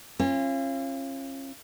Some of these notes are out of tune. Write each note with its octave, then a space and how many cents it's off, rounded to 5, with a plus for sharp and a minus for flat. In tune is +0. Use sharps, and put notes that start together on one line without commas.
C#4 -40 F4 -30